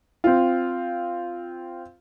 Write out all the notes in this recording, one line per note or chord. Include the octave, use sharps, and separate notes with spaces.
C4 F4